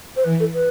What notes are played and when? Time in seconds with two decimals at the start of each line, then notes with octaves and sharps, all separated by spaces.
0.16 C5
0.24 E3 B4
0.40 A4
0.53 B4